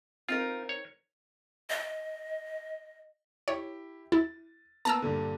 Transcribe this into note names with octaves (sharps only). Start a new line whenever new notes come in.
C4 D#4 F4 A#4
C#5
D#5
E4 G4 C#5
E4 A6
A#3 B3 A5 A#5 E6
G2 A#2 D3